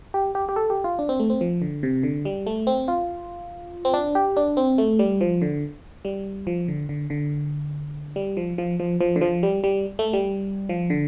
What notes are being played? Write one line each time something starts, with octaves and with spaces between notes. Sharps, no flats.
G4
G4
G4
A4
G4
F4
D4
C4
A3
C4
F3
D3
C3
D3
G3
A3
C4
F4
C4
D4
G4
D4
C4
A3
G3
F3
D3
G3
F3
D3
D3
D3
G3
F3
F3
F3
F3
D3
F3
G3
G3
A3
G3
F3
D3